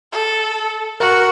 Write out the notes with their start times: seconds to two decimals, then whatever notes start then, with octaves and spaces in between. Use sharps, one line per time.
0.12 A4
1.00 F#4 A#4